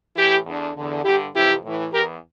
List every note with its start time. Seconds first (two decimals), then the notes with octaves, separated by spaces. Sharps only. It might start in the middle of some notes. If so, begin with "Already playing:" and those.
0.16 A2 E3 E4 G4
0.45 E2 D3
0.76 E2 D3
1.04 G2 D3 E4 G4
1.34 F2 C3 E3 E4 G4
1.64 A2 E3
1.92 E2 E3 G4 A#4